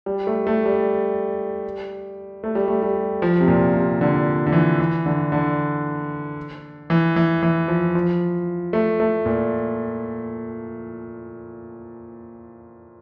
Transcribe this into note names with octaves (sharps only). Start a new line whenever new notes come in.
G3
A3
A3
G3
A3
G3
A3
G3
F3
C3
A#2
C3
D3
D3
E3
E3
D3
D3
E3
E3
E3
F3
F3
A3
A3
A#2